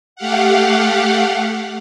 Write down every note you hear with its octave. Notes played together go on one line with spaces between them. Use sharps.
A3 G4 F5 F#5